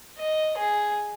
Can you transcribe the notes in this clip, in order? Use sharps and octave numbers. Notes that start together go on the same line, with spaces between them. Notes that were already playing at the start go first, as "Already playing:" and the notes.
D#5
G#4